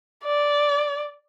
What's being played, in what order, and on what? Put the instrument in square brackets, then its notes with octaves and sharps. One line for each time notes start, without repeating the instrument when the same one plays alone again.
[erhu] D5